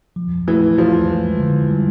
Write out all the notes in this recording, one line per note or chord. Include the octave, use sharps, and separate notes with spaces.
F3
E3 A3
E3 F3
G#3
D3
G3